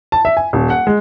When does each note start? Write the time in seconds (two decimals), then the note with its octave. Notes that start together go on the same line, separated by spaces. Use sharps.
0.12 A5
0.25 E5
0.37 G#5
0.53 D#1
0.70 F#5
0.87 G#3